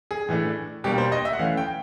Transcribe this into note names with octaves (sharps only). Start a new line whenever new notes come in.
G#4
A2 E3 A3 D4
B2 G3 A#3 D4 G4
C5
D#5
E5
F#5
E3 A3 C#4 F5
G5